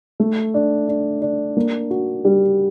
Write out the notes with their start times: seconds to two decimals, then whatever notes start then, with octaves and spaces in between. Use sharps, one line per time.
0.20 A3
0.54 D4
0.88 D4
1.22 D4
1.57 A#3
1.90 F#4
2.25 G3